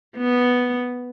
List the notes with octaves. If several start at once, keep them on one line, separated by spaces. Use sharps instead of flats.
B3